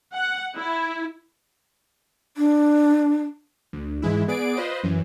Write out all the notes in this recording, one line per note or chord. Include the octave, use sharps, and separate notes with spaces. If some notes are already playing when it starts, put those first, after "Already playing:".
F#5
E4
D4
D2
G#2 E3 G#3 E4
B3 G#4 D5 D7
F4 B4 C5 D#5
F#2 E3